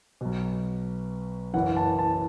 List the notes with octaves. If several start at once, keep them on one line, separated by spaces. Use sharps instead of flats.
B1 B2
F#1 F#2 E3 F#5
A5
A5